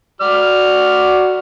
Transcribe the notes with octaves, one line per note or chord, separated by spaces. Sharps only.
F#4 D5 F6